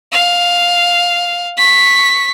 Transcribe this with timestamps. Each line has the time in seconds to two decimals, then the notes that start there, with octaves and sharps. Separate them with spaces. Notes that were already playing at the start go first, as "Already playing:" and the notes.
0.12 F5
1.58 C#6 B6